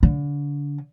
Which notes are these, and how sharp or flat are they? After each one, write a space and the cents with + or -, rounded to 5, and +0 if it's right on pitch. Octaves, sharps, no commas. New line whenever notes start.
D3 -30